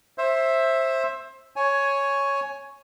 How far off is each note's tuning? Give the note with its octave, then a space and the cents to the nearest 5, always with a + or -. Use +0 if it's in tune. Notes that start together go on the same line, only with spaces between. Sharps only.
C5 +25 E5 +0
C#5 +0 G#5 +10